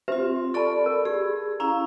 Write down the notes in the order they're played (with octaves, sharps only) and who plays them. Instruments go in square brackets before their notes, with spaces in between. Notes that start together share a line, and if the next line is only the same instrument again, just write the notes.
[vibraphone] C4 F4 [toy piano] G4 C5 E5
[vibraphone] A4 D5 B5 [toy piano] A5 C#6
[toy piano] A#4
[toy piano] G4 [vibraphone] G#4
[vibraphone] C#4 E4 F5 [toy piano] A#5